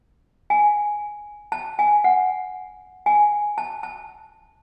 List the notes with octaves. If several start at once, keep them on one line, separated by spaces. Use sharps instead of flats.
G#5
A5
G#5
F#5
G#5
A5
A5